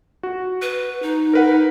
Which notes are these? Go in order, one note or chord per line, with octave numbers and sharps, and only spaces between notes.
F#4
B4
D#4
A#4 B4 F#5